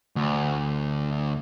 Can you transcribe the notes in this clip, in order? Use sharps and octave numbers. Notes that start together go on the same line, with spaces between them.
D2